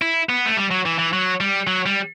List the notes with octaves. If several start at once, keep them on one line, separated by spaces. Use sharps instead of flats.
E4
B3
A3
G3
F#3
E3
E3
F#3
G3
F#3
G3